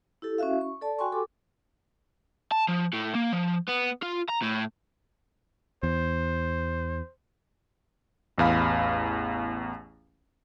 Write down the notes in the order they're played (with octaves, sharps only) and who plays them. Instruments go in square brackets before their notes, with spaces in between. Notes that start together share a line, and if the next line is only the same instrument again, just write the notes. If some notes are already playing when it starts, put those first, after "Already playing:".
[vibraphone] E4 G4 A4
C#4 E4 F#4 E5 F5
C#6
A4 D5 A5
F#4 G5 G#5 C6 C#6
G4 A4 D6
[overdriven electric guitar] A5
F3
A2
A#3
F3
B3
F4
A#5
A2
[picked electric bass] E2 [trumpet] C5
[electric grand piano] A1 E2 F5 B5